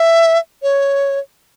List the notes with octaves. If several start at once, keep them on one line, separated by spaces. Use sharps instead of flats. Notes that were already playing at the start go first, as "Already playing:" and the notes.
Already playing: E5
C#5